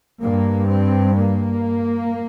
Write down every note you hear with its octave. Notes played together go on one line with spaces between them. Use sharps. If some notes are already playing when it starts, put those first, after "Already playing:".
G2 A#3
C4
A#3